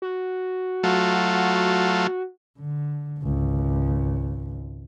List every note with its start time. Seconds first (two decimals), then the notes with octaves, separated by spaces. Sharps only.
0.02 F#4
0.83 F#3 A3 F4
2.59 D3
3.19 G#1 C#2